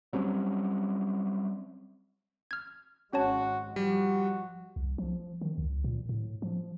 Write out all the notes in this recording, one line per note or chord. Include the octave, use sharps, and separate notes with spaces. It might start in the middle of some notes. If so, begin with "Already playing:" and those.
F#3 G3 C4 C#4
F6 G#6
G#1 G#3 C#4 F#4 C#5 A5
F3 G3 F#4
C2
F3
D#3
C#2
A#2
A2
F3